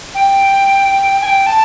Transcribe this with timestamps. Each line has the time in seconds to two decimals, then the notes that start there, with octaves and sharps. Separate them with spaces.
0.14 G5
1.21 G#5
1.25 G5
1.46 A5